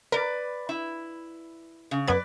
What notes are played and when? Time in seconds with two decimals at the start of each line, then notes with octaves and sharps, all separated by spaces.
0.12 A#4 B4 D5
0.69 E4
1.91 C#3
2.07 F#2 B3 B4 D5 G#6